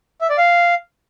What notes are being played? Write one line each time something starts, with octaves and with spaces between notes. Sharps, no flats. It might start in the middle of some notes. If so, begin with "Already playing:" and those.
E5
D5
F5